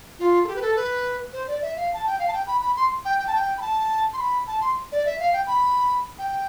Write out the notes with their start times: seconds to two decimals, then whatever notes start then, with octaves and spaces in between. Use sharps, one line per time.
0.19 F4
0.43 A4
0.47 G4
0.55 B4
0.61 A4
0.76 B4
1.33 C5
1.47 D5
1.62 E5
1.76 F5
1.93 A5
2.06 G5
2.19 F5
2.28 A5
2.32 G5
2.47 B5
2.61 B5
2.76 C6
3.04 G5
3.18 G5
3.27 A5
3.35 G5
3.57 B5
3.61 A5
4.13 C6
4.18 B5
4.47 A5
4.60 C6
4.92 D5
5.05 E5
5.19 F5
5.32 G5
5.47 B5
6.18 G5